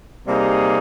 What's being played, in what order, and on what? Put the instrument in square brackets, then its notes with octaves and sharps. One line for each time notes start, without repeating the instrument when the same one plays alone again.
[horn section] C3 G3 A#3 D#4 G#4